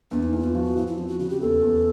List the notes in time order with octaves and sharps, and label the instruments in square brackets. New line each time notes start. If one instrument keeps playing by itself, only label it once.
[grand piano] E2 [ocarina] D4
[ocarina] D#4
[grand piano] E2 [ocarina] E4
[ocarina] F4
[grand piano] F3 [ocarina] F#4
[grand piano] F3 [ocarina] E4
[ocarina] E4
[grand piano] C4 [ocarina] F4
[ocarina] F#4
[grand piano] C#3 [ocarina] F#4
[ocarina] G4
[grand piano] E2 [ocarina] A4
[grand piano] E2